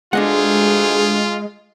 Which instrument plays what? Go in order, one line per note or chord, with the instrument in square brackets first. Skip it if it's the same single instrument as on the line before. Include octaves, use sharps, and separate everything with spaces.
[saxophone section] D2 G#4 [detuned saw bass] G#3 [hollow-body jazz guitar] D4 D#5 F#5 [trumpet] F4